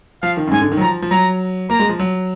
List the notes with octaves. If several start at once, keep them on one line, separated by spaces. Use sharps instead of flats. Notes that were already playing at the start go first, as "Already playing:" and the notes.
F3 F5
D#3
F#2
G#2 G#5
D3
D#3
F#3
F3 A#5
F3
F#3 A#5
A#3 A#5
G#3
F3
F#3